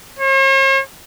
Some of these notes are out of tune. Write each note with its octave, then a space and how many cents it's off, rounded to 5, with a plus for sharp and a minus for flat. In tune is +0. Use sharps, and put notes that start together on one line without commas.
C#5 -45